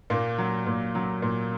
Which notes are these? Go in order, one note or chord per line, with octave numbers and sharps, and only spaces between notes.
A#2 A#3
F#3
A#2
F#3
A#2